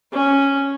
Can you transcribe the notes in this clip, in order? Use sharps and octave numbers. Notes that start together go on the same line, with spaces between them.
C#4